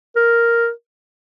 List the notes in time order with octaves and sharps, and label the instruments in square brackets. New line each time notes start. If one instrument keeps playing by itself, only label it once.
[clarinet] A#4